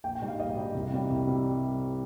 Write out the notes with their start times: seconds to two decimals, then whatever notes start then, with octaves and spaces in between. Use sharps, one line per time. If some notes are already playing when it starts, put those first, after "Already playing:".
0.04 A#1 G5
0.15 G5
0.21 G#2 G3
0.28 F5
0.40 A#1 D#5
0.56 G#2 G3
0.75 C2
0.93 C3 G3
1.10 C2
1.27 C3 G3